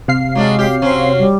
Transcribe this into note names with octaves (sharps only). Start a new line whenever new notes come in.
C3 F5 C7
F#3 G#3 D4
G4
F#3 C4 C#4
G3